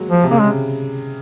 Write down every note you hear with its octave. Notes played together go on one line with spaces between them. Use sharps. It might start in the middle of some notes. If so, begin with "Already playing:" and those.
Already playing: F#3 G#3 A#3
F3
C3
C#3 A#3
C3 G#3